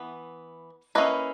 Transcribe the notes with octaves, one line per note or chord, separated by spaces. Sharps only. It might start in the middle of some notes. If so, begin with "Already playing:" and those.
Already playing: E3 B3
A#3 C#4 E4 B4 D#5